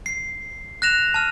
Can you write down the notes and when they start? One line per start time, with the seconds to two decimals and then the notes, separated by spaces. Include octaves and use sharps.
0.06 C7
0.82 F#6 A#6 E7 F7
1.14 A5 F6